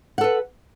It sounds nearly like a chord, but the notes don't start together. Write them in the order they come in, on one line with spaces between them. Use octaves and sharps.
F#5 A4 B4